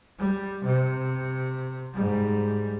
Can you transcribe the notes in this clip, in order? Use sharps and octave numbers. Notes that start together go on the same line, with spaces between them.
G3
C3
G#2 G3